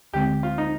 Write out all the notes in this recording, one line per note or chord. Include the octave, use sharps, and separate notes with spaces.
D2 D3 G#3 C4 G4
F4
D#4